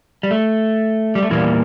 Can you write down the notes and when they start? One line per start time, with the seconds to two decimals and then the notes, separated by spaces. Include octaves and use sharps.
0.23 G3
0.31 A3
1.15 G3
1.23 A3
1.30 E2 A#2 E3 G3 A#3